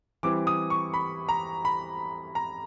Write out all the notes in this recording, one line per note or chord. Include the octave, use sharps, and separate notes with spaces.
E3 G3 C4 E4 D6
D#6
C#6
B5
A#5
B5
A#5